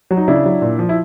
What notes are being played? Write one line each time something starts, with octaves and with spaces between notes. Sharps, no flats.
F#3
D#4
C#3 D4 E4
F#3
A#2
F3
E4